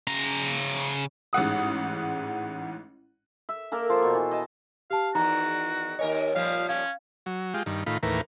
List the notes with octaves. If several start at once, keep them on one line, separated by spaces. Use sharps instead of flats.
C#3 A#5
A1 G#2 F#5 D#6
E5
A#3 A4 A#4 D5
F3
B2 C#6
E3
D#5 A5
G4 F5 A5
E2 D#3 D#4 F#4 A#5
D#2 A#4 C#5 D#5 G#5
A#2 F3 G3 F5
C#4 F5
F#3
G#3 F4 G4
G2 D#3
A2 D#3 F4 B5
D#2 A2 E3 A#4 B4